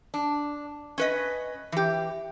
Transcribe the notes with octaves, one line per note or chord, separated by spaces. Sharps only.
D4
C#4 B4 D#5
E3 G4